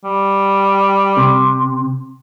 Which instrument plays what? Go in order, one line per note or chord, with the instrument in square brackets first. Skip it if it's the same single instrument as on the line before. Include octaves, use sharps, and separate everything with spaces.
[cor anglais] G3
[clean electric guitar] C3